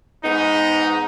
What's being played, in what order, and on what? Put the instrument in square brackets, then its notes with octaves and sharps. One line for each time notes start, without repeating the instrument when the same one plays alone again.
[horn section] G#2 B3 D#4